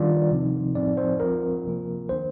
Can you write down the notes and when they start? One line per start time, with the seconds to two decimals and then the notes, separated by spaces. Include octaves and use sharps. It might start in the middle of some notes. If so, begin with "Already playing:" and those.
Already playing: D#3 G3 D4 F4 D5
0.31 C3 F3 C4 D#4
0.75 A2 F3 C4 D#4 D5
0.97 C5
1.20 F3 C4 F4 A#4
1.65 C3 F3 A#3 F4
2.09 D#3 A#3 D4 C5